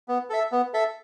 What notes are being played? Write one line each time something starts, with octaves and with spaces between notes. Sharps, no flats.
B3
A4 E5
B3
A4 E5